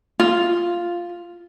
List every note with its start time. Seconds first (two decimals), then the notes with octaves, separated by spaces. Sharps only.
0.20 F4